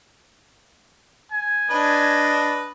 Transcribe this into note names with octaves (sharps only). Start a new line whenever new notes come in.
G#5
D4 B4 D#5